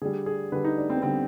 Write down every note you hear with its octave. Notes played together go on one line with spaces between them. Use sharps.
D3 G3 G#4
G#4
D3 G3 B4
D#4
D4
C4
B3
D3 G3 C4